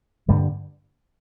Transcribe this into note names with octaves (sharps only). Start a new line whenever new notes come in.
G2 D3 G3 A#3